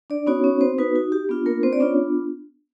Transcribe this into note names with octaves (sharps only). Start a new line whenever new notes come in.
D4 D5
B3 C#4 D#4 F#4 C#5
C#4 C#5
C4 C5
B3 D#4 F#4 B4
F#4
G4
B3 D4 F4
A#3 A#4
C4 C5
D5
B3 C#4 D4 F4 C#5